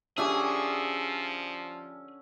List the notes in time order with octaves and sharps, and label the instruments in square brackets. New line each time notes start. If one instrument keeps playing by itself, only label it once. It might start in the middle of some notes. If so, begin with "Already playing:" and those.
[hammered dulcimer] D3 C#4 E5 [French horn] F3 [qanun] D4 G4 B4 [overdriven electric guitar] G#4